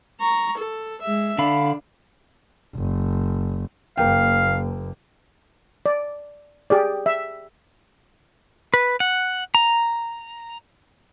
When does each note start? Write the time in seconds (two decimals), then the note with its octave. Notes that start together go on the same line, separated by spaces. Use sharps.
0.20 A#5 C#6
0.58 A4
1.02 G#3 E5
1.38 D3 D4 F5 B5
2.75 F#1
3.98 F#1 A#3 F5 G5
5.86 D5
6.70 G4 G#4 D5
7.06 E5
8.74 B4
9.00 F#5
9.55 A#5